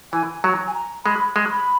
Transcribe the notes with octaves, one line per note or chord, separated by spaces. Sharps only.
E3 G#5
F#3 A#5
G#5
A#5
G#3 B5
G#3
B5